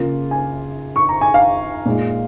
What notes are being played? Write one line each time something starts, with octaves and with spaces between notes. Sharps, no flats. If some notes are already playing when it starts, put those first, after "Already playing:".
Already playing: C#3 A#3 F4
G#5
C#6
A#5
G#5
F5
A#2 G#3 D#4